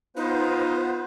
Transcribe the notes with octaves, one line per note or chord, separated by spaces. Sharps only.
B3 D#4 F4 B4 C5